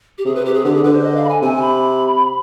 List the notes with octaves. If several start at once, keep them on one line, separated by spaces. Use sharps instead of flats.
G4
C3 G#4
B4
G4
G#4
D3 G4
G#4
D3 B4
C5
D#5
F5
B5
G#5
C3 G#5
G#5
B5